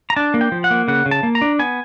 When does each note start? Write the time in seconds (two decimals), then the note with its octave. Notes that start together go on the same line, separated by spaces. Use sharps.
0.10 A#5
0.16 D4 A5
0.34 A#3
0.41 G5
0.52 F3
0.64 F#5
0.71 A#3
0.88 C#3 F#5
1.06 C#3
1.11 A5
1.23 A#3
1.35 A#5
1.41 D4
1.59 B3 G#5